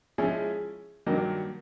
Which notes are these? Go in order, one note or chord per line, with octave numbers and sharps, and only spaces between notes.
F3 G#3 C#4 E4 G#4
G2 D#3 F#3 A#3